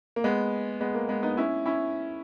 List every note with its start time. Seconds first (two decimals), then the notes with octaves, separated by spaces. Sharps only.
0.16 A#3
0.24 G#3 B3
0.81 G#3 B3
0.95 A#3
1.09 G#3 B3
1.23 B3 D#4
1.37 C#4 E4
1.66 C#4 E4